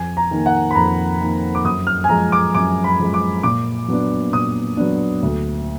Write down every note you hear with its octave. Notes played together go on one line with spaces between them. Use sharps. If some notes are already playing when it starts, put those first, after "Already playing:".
Already playing: F2 G#5
A#5
D#3 A#3
F#5
B5
F2 A#5
D#3 A#3
D6
F#2 D#6
F6
G#5
F3 G#3 A#5
D6
F#2 D6
B5
F3 G#3
D6
A#2 D6
F#3 B3 D4
A#2 D#6
F#3 B3 D4
D2